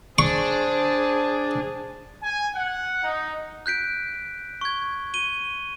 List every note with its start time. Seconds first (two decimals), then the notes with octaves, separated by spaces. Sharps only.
0.19 D4 G#4 C5 A5 C#6
2.22 G#5
2.54 F#5
3.03 D#4
3.66 F#6 G6 B6 D7
4.61 C#6 G#6
5.14 D#7 G7